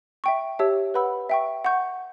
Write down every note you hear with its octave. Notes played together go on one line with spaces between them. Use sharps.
E5 G5 C#6
G4 C#5 E5 A5 E6
B4 F#5 B5 E6
E5 G5 C#6
F#5 C#6 G6